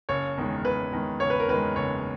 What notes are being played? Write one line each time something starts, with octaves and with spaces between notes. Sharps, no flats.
F#1 C#5
E2 D#3 G#3
F#1 B4
E2 D#3 G#3
F#1 C#5
B4
A#4
E2 D#3 G#3 B4
F#1 C#5